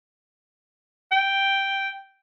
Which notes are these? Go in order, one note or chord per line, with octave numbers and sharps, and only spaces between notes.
G5